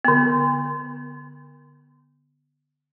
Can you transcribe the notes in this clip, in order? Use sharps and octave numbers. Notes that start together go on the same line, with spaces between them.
D3 B3